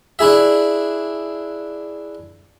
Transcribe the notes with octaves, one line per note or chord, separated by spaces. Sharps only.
D4 E4 G#4 E5